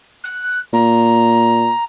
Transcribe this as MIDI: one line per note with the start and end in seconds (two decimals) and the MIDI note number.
0.23 0.59 90
0.73 1.70 46
0.73 1.83 82